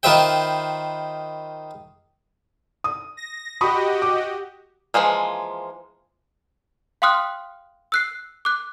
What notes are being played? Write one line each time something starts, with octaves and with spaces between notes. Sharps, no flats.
D#3 F4 B4 C5 E5 G5
D#6
A#6
F#4 G4 D#5 B5 C#6 D#6
D6
E3 F3 G#3 A#3
F5 G5 C6 D#6 F6 F#6
E6 F#6 C7
D6 F#6